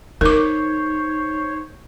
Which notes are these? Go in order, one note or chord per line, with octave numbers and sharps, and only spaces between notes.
D#4 A#4 C5 C#5 D6